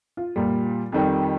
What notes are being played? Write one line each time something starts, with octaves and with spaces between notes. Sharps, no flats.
F4
A#2 G3
F2 D#3 G3